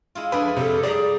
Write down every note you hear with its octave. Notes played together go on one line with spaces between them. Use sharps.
G#3 E4 F4
F2 D4 G#4 B4 D5
C3 A4
G3 G#4 D5 A#5